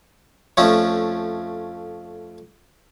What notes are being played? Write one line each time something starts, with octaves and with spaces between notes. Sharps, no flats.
F2 F3 A3 C#4